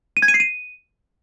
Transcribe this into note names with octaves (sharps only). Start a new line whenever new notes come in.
D#7
G#6
D#7
C7
D#7